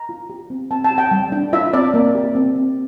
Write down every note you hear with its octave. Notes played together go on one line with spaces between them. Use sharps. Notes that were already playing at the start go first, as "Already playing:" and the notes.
Already playing: A#5
F4
G4
C4
C4 A5
A5
G4
G5
G3
D4
F4 E5
C4 D5
A#3
G4
C4
C4